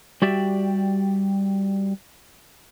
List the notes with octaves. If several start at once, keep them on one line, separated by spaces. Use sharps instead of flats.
G3 F#4 G4 D5 E5